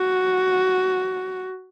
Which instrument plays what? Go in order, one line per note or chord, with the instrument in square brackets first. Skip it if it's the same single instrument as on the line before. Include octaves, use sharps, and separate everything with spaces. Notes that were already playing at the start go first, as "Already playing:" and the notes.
Already playing: [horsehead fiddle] F#4